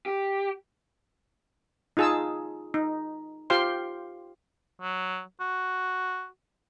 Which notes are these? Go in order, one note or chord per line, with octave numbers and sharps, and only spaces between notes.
G4
D#4 F4 G#4 A5 E6
D#4
F4 G4 C5 F5 G5 C6
F#3
F#4